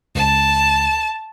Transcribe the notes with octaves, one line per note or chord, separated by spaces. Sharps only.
C#2 A5